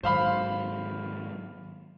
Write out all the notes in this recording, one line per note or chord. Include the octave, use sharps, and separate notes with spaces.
G#2 D#3 F#3 C5 F5 B5